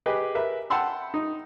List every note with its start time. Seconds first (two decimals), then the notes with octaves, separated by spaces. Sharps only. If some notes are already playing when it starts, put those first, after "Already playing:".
0.06 G4 G#4 B4 D#5
0.35 A#4 B4 E5
0.70 F#5 G5 A5 B5 C6 E6
1.14 D#4